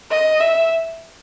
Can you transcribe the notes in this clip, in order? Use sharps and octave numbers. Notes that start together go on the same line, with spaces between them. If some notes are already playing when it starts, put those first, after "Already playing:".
D#5
E5